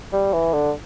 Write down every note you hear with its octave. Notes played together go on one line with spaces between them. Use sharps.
G3
E3
D3